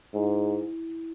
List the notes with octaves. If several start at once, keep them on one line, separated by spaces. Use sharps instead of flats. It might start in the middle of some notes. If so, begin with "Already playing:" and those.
G#2 E4